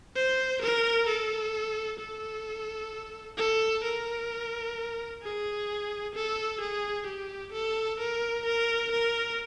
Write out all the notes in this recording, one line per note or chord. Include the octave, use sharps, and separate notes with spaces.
C5
A#4
A4
A4
A4
A#4
G#4
A4
G#4
G4
A4
A#4
A#4
A#4